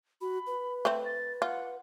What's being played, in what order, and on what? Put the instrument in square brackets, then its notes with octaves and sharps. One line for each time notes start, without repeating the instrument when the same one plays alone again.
[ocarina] F#4 [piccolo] B5
[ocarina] B4
[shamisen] A3 C4
[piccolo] A6
[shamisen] F4 [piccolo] F#5